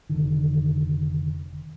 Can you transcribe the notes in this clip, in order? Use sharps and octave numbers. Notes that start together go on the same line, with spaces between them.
F1 D3 D#3